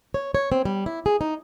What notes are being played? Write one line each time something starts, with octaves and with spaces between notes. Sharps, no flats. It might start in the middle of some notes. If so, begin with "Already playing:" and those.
C#5
C#5
C4
G3
E4
G#4
D#4